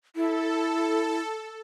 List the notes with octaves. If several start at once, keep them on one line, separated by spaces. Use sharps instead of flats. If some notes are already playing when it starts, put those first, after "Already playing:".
E4 A4